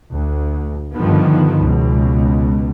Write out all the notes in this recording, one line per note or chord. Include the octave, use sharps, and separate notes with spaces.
D2
G2 D3 D#3 F3 B3
C#2 B2